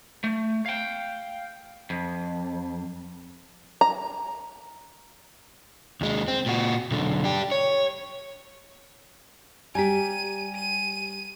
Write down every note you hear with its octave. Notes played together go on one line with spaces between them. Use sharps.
A3
F5 G5
F2
A#5
D#2 G#3
C4
A#2 F#4
B1 D3
D4 G4
C#5
G3 G4 G#5 A#5 B6 D#7
D#7